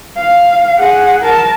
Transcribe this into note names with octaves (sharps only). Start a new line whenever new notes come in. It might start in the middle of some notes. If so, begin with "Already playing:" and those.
F5
G#4 F#5
A#4 A5